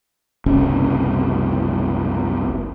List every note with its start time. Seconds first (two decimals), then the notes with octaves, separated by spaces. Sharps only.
0.46 F#1 C2 C#4